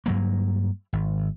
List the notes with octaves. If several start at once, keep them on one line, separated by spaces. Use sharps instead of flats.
G2 F#3 A#3
G#1